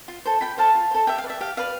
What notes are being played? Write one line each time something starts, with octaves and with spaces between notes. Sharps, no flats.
F4
A4 C5
F4 G5 B5
A4 C5 F5 A5
F4
A4 C5
G4 E5 G5
F5
B4
D5 E5
G4 F5
B4 D5 F5